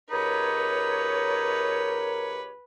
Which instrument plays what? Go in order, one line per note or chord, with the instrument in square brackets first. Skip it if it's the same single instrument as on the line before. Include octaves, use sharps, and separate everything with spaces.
[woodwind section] C#2 G4 C#5 [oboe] D#4 [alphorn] A#4 [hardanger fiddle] B4